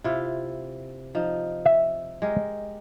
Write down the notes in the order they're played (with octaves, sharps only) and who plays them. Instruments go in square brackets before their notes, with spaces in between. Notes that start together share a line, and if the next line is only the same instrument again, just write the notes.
[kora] C3 E4 F4
F3 D#4
[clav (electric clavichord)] E5
[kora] G#3 G4 A#4